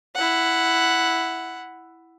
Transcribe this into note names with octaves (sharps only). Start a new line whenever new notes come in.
E4 F#5